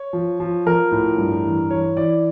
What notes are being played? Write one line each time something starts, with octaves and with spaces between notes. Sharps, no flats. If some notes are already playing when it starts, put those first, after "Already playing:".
Already playing: C#5
F3
F3
F3 A#4
A2
G2
E3
E3 C#5
E3 D5